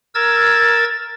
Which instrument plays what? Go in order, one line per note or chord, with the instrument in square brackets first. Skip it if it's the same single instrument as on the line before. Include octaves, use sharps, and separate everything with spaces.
[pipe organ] A#4 E6 G#6 A6